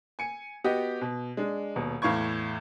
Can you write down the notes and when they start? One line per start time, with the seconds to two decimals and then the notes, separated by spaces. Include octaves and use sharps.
0.19 G#5 C#7
0.64 B3 F#4 G4 D#5
1.01 B2
1.37 G#3 D4
1.76 D#1 B2
2.02 E2 A2 F5 B5 C#6 G#6